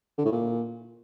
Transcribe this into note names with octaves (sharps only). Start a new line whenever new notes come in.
D3
A2
A#2